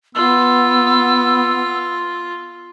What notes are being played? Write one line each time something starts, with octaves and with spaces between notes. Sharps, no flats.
B3 F4 E6